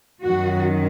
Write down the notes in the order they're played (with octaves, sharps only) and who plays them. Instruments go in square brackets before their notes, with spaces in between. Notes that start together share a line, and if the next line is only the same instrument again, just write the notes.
[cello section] F#2 D#3 F#4